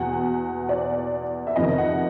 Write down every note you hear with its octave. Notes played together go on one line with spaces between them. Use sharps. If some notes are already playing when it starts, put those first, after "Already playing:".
Already playing: E2 B2 F#5
D5
E5
F2 C3 D#3 D#5
F#5